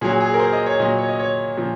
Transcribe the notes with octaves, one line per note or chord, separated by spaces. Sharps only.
A#2 F#3 G#4
G#4
A#4
C5
D#5
C#5
A#2 F#3 D#5
C#5
D#5
C#5
A#2 F3